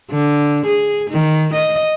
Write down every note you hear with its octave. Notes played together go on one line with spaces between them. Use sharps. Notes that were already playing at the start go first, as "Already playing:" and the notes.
D3
G#4
D#3
D#5